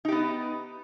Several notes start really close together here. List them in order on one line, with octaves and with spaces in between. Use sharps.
D#4 G4 B3 D#5